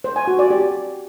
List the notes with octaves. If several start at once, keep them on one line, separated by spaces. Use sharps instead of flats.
C5
G#5
F#4
D5
G4